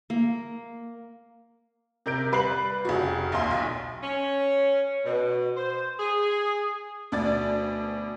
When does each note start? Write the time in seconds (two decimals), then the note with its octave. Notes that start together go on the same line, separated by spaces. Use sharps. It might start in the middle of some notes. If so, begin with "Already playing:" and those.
0.10 A#3
2.06 C3 A#4 G6 D7
2.32 G3 B4 C7 F#7
2.85 F1 C#3 F#4
3.32 A#1 D#2 F5 C6
3.51 B1
4.03 C#4
5.06 B2
5.57 C5
6.00 G#4
7.12 D2 B2 D5 D6 A6